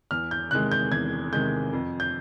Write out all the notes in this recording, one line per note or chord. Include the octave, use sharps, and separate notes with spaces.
E2 F6
G6
C3 D#3 G#3 F#6
G6
E2 G#6
C3 D#3 G#3 G6
F2
G6